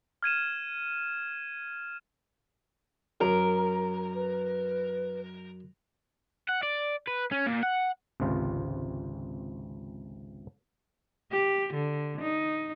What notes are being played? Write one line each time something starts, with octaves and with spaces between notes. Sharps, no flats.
F6 G#6 D#7 E7
F#2 A#4
B4
F#5
D5
B4
C#4
A#2
F#5
G#1 C#2 C3 F4
G4
D3
D#4